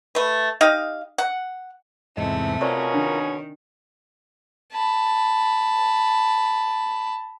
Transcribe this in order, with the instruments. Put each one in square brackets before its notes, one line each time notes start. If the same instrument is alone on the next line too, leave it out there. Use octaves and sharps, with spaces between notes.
[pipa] A3 B4
D#4 G4 D#5 F5
F#5
[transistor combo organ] E2 G#2 [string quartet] C3 A3 [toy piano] D#5
[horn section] B2 C#4 G#4 [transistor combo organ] F4 A#4 [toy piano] C5 D5 C#6
[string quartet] D#3 [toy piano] D4
[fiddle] A5 B5